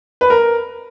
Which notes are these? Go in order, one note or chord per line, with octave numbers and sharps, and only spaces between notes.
B4
A#4